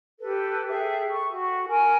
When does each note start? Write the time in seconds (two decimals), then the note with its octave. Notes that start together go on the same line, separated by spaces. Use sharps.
0.19 G4 A4 B4
0.69 G#4 A4 E5 G5
1.10 C#6
1.25 F#4
1.68 A#4 G#5